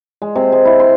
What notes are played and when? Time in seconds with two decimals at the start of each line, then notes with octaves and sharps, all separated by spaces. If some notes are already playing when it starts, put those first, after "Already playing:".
0.22 G#3
0.35 C3
0.52 G#3
0.65 E4
0.80 C6